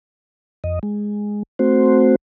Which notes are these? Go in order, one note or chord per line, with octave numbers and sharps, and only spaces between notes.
F2 D#5
G#3
A3 C4 F#4 C5